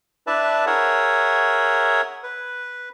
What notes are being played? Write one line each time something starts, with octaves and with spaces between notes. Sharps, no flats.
D4 E4 B4 D5 E5 A5
G#4 A#4 C#5 E5 F#5
B4